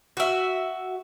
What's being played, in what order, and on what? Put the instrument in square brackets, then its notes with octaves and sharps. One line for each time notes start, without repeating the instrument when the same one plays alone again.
[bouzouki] F#4 E5